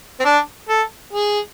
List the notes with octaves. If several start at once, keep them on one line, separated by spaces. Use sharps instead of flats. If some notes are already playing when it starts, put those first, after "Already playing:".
C4
D4
A4
G#4